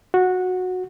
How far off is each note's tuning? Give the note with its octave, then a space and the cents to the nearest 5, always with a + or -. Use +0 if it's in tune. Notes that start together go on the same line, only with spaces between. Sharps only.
F#4 -15